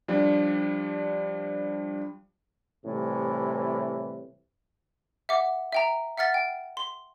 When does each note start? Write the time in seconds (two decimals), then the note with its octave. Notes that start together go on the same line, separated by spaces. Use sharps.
0.08 F3 G3 D4
2.85 A2 C3 E3 G3
5.29 E5 F#5 D6
5.72 E5 G5 A#5
6.18 E5 F#5 F6 A6 B6
6.34 G5
6.77 C6